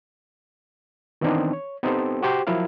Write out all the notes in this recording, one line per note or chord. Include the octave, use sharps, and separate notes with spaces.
D#3 E3 B3 C4 D4 D#4
C#5
B3 C4 D#4 G4 A4 C5
F#4 G4 C5 G5
F3 F#3 E4 A#4 F5